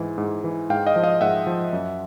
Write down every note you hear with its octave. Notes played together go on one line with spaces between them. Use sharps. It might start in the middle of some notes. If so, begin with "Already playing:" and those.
Already playing: G#2 E3
G#2
E3
G#2 F5 G5
D#5 F5
F3
D#5 F5
G#2 E5 F#5
F3
F#2